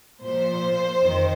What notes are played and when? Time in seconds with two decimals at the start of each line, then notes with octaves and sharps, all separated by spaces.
0.23 A#2 F3 C5
1.01 F2 D#3